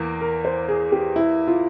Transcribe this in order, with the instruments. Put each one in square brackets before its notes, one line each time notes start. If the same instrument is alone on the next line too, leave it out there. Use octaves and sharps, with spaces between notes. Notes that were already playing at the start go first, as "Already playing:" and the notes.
Already playing: [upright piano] E2 E3 A#3
[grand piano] A#4
C5
G#4
G4
E4
F4